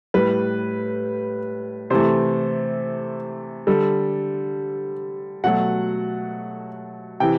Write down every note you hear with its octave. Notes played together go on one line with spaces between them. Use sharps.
A2 G3 B4
C3 E3 A3 C5
D3 G3 A4
B2 F#3 A3 F#5
C3 E3 G5